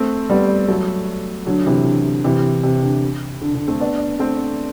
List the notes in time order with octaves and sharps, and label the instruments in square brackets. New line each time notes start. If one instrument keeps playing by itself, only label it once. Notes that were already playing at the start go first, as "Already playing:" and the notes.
Already playing: [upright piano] A3 C4
G3 B3
F#3 A3
D3 F#3
C3 E3
D3
C3 E3
C3
D3
D3
D3
A3 C4
B3 D4
A3 C4